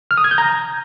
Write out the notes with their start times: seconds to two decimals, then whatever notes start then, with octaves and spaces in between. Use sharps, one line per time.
0.11 F6
0.17 D#6
0.24 G#6
0.31 G6
0.38 A#5